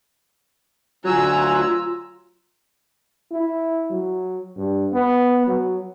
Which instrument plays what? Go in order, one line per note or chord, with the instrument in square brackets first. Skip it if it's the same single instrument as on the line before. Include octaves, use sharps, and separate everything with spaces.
[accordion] D2 G#5 F#6 [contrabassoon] F#3 [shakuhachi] F4 [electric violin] A#5 E6
[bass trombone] E4
F#3
G2
B3
F#3